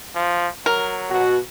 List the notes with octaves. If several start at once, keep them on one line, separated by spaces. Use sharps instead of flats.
F3
F#3 A#4
B2 F#4